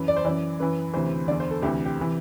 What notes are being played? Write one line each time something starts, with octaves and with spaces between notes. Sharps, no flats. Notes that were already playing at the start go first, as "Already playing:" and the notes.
Already playing: F#2 E3 B4
D5
C5
F#2 E3 D5
F#2 E3 B4
D2 C3 E3 C5
E2 D3 D5
C5
A4
D2 C3 E3 G4
G4
C3 E3